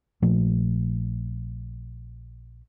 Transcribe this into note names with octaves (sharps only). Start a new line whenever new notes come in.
A#1 A#2 F3 A3